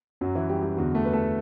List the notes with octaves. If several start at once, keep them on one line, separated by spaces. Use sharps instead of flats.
F#2 F#3 F#4
E3 E4
G3 G4
G3 G4
E2 D3 F#3 F#4
A3 A4
B4
A3 A4